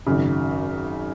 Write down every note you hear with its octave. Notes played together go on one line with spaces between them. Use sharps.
G#1 F#2 C#3